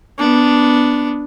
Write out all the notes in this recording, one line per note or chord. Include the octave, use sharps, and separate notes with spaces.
B3 D4